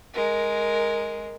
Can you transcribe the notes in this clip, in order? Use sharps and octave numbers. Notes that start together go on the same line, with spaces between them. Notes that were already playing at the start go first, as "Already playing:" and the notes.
G#3 A#4